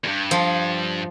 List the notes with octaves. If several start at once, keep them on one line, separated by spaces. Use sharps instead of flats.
E2 G2
F3